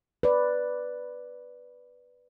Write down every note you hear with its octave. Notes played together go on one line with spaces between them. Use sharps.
B4 D5